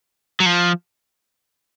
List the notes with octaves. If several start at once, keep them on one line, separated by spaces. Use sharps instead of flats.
F#3
F3